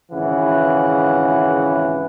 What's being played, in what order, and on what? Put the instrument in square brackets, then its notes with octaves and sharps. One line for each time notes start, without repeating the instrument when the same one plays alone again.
[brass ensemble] G#1 C#3 E3 F#5